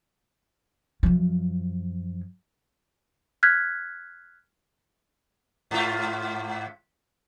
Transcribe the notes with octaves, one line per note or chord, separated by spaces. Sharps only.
F#2 F3
F6 F#6 G#6 B6
G#2 F4